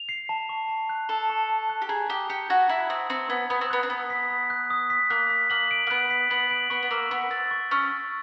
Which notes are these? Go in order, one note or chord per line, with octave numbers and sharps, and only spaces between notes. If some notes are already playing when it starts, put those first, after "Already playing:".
Already playing: F7
C7
A5
C#6
A5
F#6
A4 A5
C#6
A5
F#6
G4
G#4 A#5
G4 D#6
G4 C#7
F#4 G#6
E4 A#5
C4 D#6
C4 C#7
B3 G#6
B3 D#6
C4
B3 F#6
C4
B3 D#6
B6
D#6
F#6
D#6
B6
A#3 F#6
B6
A#3 F#7
D7
A#3
B3 F#6
B6
B3 F#7
D7
B3 C#6
B3
A#3 E6
B3 C#6
C4 A6
C#6
C#4 E6
C#6